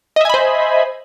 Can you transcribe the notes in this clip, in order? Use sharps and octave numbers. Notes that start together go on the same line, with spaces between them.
C5 D#5 E5 G#5 B5